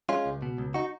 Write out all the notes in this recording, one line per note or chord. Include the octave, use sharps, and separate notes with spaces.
G#3 C#4 F4
C#2
B2
C#2
D#4 F#4